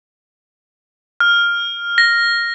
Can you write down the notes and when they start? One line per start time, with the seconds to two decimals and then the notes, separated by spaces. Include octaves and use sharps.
1.20 F6
1.98 A#6